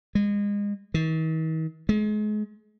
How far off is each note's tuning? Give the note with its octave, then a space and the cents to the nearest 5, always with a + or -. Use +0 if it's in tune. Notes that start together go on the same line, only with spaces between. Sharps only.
G#3 -30
D#3 +45
G#3 +35